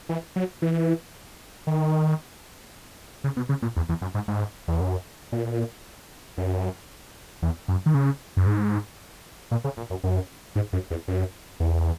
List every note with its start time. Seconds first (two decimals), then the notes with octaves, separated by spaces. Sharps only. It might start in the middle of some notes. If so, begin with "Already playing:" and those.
0.09 E3
0.36 F#3
0.62 E3
1.67 D#3
3.24 C#3
3.37 B2
3.49 C#3
3.62 A#2
3.76 E2
3.89 E2
4.02 F#2
4.15 G#2
4.28 G#2
4.68 E2
4.81 F#2
5.32 A#2
6.38 F#2
7.42 E2
7.68 F#2
7.86 D#3
7.94 C#3
8.37 F#2
8.47 G#2
9.51 A#2
9.64 C#3
9.77 A#2
9.90 F#2
10.04 F#2
10.56 G#2
10.73 F#2
10.90 E2
11.08 F#2
11.60 E2